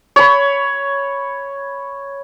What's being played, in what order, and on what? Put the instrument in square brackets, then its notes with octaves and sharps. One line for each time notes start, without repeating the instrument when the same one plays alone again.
[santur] C#5 B5